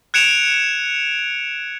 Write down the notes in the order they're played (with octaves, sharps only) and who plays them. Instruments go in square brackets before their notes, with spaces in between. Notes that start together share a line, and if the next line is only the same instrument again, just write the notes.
[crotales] F#6 G#6 C#7 D7 E7 F7